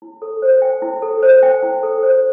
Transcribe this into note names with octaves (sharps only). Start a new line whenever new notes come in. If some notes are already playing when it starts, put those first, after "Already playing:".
E4
A4
C5
G5
E4
A4
C5
G5
E4
A4
C5